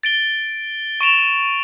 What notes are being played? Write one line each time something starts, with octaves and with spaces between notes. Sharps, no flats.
A6 D7 G7
C#6 D7 E7 F7